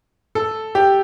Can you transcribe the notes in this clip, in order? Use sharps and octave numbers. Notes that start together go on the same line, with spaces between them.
A4
G4